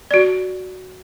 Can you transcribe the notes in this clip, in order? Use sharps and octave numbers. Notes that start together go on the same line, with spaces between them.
F#4 D5